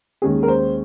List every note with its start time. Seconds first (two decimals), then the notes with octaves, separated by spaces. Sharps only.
0.22 D#2 D#3 G#3 C#4 G#4
0.43 A#4
0.48 C5